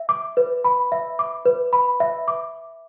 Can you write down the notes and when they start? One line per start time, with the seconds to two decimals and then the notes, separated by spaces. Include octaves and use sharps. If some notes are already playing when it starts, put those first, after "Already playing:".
Already playing: E5
0.09 D6
0.37 B4
0.64 B5
0.92 E5
1.19 D6
1.45 B4
1.73 B5
2.00 E5
2.28 D6